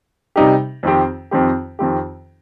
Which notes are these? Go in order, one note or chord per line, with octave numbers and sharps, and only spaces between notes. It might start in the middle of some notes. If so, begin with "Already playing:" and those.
C3 G3 D#4 G4
F2 D#3 C4 G4
F2 D#3 C4 G4
F2 D#3 C4 G4